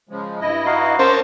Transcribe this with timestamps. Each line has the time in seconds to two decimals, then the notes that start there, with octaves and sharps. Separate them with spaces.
0.09 C#3 F3 G#3
0.40 G2 E4 D#5
0.66 D#4 F#4 F5
0.99 C#4 A#4 C5 F#5 A5 D6 E6